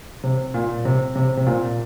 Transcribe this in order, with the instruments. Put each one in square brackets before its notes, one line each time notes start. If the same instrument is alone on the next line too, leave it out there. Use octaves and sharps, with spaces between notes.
[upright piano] C3
A#2
C3
C3
C3
A#2